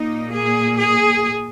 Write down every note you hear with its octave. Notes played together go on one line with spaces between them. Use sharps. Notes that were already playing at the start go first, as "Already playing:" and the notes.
Already playing: A#2 A#3 D#4
G#4
G#4